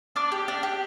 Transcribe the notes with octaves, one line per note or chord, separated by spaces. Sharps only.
D4 D6 F6
G4
D4
G4